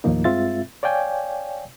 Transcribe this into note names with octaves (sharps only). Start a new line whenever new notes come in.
D#2 A2 D#3 F3 A#3 D#4
G2 G#3 C4 F4 E5 A6
C#5 D5 F5 G5 G#5